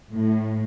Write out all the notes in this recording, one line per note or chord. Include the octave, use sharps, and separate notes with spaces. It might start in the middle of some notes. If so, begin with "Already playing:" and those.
A2